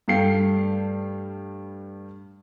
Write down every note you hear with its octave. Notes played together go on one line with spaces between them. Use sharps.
G2 G3 A3 F5 G5 C7